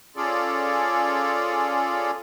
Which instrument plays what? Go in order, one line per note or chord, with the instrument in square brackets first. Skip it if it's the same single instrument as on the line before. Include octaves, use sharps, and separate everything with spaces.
[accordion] C#4 F4 G#4 A4 D5